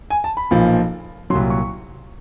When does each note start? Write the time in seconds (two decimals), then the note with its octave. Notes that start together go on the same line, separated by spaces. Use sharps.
0.10 G#5
0.24 A5
0.37 B5
0.51 B1 A#2 F3
1.30 C2 A#2 F#3 C6
1.50 C#6